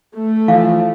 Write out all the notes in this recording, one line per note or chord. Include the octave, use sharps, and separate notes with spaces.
A3
E3 F3 F5